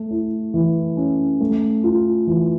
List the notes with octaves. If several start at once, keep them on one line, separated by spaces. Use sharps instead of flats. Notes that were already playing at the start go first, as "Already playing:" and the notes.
Already playing: A3
E4
E3
C#4
A3
F4
E3